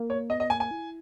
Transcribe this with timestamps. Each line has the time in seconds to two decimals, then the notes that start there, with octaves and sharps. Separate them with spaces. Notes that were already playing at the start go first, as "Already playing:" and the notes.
Already playing: A#3
0.10 C#5
0.30 B3 D#5
0.40 D#5
0.50 A#3 G#5
0.60 G#5
0.71 E4